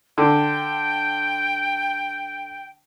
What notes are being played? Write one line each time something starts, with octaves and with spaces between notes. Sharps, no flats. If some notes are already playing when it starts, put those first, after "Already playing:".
D3 G5